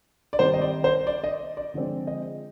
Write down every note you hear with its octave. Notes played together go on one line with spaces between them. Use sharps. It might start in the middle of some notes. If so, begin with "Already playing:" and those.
D5
D#3 G3 C4 C5
D#5
D5
C5
D5
D#5
D5
D3 F3 G#3 C4
D#5